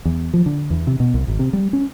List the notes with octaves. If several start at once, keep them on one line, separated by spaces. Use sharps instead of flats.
E2
F3
D3
E2
C3
B2
C2
G#1
C3
G3
C#4